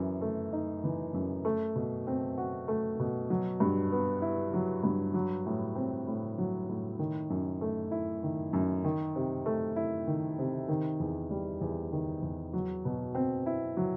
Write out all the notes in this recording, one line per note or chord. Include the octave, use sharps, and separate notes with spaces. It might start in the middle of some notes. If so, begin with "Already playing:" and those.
Already playing: F#2 E3
A3
D#4
E3
F#2
A3
B2
C4
F#4
A3
B2
F#3
G2
B3
E4
F#3
G2
F#3
A2
C4
A2
F#3
A2
D#3
F#2
A3
E4
D#3
F#2
D#3
C3
A3
E4
D#3
C3
D#3
E2
G3
E2
D#3
E2
F#3
B2
C4
E4
F#3